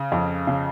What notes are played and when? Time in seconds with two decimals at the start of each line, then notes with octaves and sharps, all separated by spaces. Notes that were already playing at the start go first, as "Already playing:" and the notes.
Already playing: C#3
0.12 F2
0.47 C#3